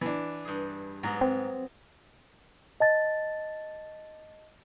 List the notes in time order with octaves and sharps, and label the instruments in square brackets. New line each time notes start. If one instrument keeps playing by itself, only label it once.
[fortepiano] E3 D4
[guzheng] G2 G#4
[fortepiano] G#2 A#5 [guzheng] F#3 B3
[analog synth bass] C4
[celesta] D#5 A5 A6